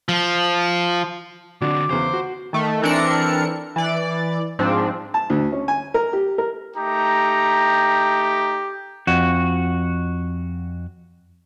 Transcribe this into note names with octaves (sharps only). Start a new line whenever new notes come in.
F3
D3 C4 D4 F#4 D6
E2 C#3 C5
F#4
D#3 A3
E3 C4 D4 A4 A#4 C#7
E3 D5
G#2 F3 C4 D4
A5
D2
C#4
G#5
A#4
G4
A#4
A3 D#4 G4 A#5
F2 F#4